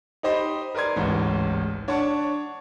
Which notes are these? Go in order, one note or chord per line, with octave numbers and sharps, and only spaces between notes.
D#4 G4 C5 D#5 B5
A#4 B4 D5 C6 G#6
D1 A1 G#2
D4 C#5 F#5 A5 C#6